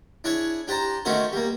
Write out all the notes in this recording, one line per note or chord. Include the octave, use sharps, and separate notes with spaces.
D4 E4 G#4 C#5
D4 G4 C5 A5 A#5
D#3 A3 C#4 F#4 A4 C5
G3 A#3